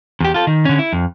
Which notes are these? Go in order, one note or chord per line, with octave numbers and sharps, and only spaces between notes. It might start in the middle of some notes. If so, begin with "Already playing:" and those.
E2 G4
F4 A4
D#3
D3 C#4
E4
F2